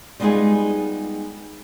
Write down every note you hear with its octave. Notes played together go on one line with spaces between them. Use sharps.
G3 G#3 B3 D#4 F4 G#4